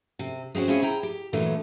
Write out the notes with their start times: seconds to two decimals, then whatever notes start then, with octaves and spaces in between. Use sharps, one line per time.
0.19 C3
0.55 G#3 C4 C#4 F#4
0.68 C4 C#4 E4 F4 G#4 C#5
0.83 E4 G5 A#5
1.03 G4
1.33 A#2 D3 E3 F#3 A3 B3